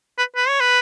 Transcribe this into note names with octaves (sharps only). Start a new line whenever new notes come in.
B4
B4
C#5
B4